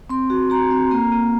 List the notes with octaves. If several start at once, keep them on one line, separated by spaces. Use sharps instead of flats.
C4 C6
F#4
F#4 A#5
C4
A#3 A#5
A#3